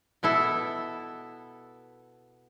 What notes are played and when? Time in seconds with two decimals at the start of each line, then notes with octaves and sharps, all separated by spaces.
0.23 B2 B3 E4 A4